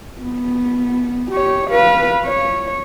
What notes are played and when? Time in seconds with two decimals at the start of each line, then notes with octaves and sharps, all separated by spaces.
0.21 B3
1.32 G4 C#5
1.70 B4 F5
2.25 C#5